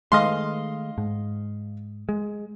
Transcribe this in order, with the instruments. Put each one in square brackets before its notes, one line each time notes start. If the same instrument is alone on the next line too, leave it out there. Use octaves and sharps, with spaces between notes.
[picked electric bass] D#3 G#3 A3 [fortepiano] D#5 F5 C6
[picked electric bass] G#2
G#3